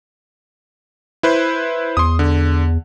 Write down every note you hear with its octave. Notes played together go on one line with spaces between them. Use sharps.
E4 B4 C5
E2 C6 D#6
D3